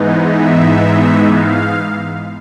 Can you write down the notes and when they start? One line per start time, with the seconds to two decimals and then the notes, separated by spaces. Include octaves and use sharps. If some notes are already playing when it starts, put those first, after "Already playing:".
Already playing: G#2 E3 G#3 B3 D#4
0.29 E5
1.30 F5